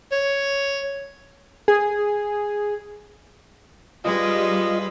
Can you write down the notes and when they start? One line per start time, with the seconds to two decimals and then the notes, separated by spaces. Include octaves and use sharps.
0.12 C#5
1.68 G#4
4.05 G3 G#3 F4 B4 D#5